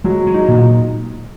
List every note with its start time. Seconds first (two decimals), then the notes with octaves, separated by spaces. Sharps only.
0.04 F#3 G#3
0.27 G#3
0.34 D#4
0.48 A#2